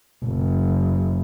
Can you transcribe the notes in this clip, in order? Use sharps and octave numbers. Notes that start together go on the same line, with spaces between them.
F#1